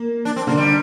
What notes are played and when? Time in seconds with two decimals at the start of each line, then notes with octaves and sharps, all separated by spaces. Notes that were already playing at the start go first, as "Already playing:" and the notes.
Already playing: A#3
0.25 D4
0.36 C4
0.47 D3 A#3
0.58 G3